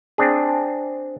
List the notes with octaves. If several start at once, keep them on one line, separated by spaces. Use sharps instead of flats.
C4 D4 G#4